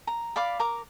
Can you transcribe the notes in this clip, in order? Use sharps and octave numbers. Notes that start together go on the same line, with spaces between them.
A#5
D5 F5 B5 D6
A#4 A#5 D6